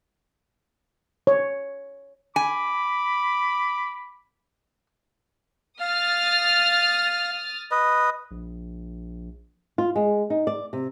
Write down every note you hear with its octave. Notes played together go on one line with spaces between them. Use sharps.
C#5
G#5 B5 D6
F5 D#6 F6 A6
B4 D#5
A#1
F4
G#3
D#4
D5
C3